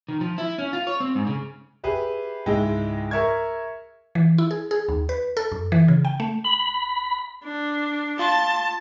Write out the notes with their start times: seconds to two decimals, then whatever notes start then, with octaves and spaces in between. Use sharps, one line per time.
0.09 D#3
0.21 F3
0.38 E4
0.58 C#4
0.73 F4
0.87 C#5
1.00 C4
1.15 G#2
1.27 C#3
1.84 G4 G#4 B4 E5
2.46 C#2 G#2 G#3 E4 D#5 G5
3.11 A#4 E5 C#6 G#6
4.15 E3
4.38 E4
4.51 G#4
4.71 G#4
4.89 D#2
5.09 B4
5.37 A4
5.52 F#2
5.72 E3
5.88 C#3
6.05 G5
6.20 A3
6.44 B5
7.44 D4
8.19 F4 F5 A5 C6 D#6